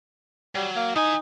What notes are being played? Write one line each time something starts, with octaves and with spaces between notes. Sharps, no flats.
F#3 G3
A#3
E3 D#4 G#5